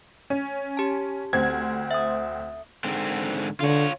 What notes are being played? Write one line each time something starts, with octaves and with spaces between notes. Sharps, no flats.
C#4
G4 A5
D2 C4 G#6
E5 D#6
G#2 D3 C4
D3 F4 C#5